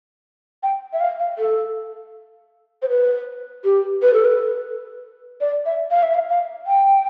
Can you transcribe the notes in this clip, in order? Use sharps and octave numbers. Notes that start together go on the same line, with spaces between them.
G5
E5
F5
F5
A4
C5
B4
G4
B4
A4
B4
D5
E5
F5
E5
F5
F5
G5